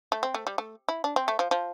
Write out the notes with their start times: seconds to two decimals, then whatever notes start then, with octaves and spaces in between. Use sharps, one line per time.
0.12 A3
0.23 C4
0.34 A3
0.47 G3
0.58 A3
0.88 E4
1.04 D4
1.16 C4
1.28 A3
1.39 F3
1.51 F3